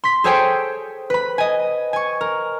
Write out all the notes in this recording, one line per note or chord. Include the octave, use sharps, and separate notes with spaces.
C6 B6
G#4 A4 C5 C#5 G5 G#5
B4 B5
D#5 G#5
G#5 C#6
A#4